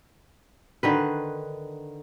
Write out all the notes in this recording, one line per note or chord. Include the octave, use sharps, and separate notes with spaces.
D3 D#3 B4